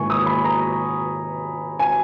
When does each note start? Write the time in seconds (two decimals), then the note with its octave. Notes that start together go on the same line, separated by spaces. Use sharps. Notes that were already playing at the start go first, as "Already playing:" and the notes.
Already playing: G#2 D#3 A#3 E4 G#5 C#6
0.10 D#6
0.26 B5
0.44 A#5
1.79 G#5